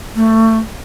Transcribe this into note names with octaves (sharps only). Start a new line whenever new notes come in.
A3